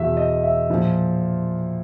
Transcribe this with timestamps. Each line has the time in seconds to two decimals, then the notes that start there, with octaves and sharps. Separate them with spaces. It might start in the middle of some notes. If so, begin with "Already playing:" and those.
Already playing: E2 B2 E5
0.17 D#5
0.43 E5
0.70 A#2 F3